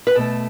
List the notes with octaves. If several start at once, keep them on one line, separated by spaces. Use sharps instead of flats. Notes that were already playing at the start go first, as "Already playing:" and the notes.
B4
B2 A3 A4